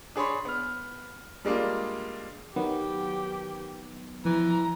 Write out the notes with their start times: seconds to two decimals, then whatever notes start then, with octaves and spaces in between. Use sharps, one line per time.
0.16 D4 G#4 C#5 B5 C6
0.45 B3 F6
1.45 G3 G#3 A#3 D4 F4
2.56 D#3 F#3 B3 G4
4.25 E3 F3 A#5